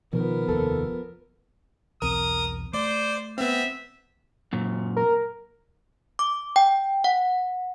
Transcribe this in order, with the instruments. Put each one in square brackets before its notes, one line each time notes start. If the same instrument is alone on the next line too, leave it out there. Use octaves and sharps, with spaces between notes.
[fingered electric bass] B2 D#3 [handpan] F3 [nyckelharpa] B3 A#4
[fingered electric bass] F1 D#2 [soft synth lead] A4
[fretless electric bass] B1 E2 C4 [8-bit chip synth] A#4 [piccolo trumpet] D#6
[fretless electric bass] A3 [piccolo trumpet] C5 [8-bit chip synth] D5 D6
[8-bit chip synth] B3 C4 [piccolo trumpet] E5
[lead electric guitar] F#2 A#2
[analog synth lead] A#4
[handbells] D6
G5
F#5